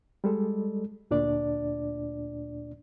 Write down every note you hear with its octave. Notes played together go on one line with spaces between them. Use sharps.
G3 G#3 A4
D2 A#2 D4 D5